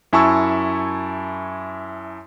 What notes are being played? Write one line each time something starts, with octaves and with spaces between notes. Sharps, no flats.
F#2 E4 G#5 A5 C#6 E6